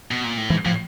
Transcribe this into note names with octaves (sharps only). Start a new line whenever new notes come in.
B2
A#2
A2
G#2 E3
A2 F3